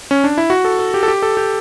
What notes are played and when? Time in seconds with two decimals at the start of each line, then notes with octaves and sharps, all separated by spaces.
0.11 C#4
0.24 D4
0.38 E4
0.50 F#4
0.65 A4
0.79 A4
0.94 G4
1.03 A4
1.08 G4
1.22 A4
1.37 G4